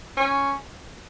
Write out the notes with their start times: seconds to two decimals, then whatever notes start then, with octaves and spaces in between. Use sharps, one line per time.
0.17 C#4